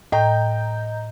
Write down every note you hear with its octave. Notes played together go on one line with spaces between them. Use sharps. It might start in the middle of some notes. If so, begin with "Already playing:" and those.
A2 D#5 G5 A#5 G6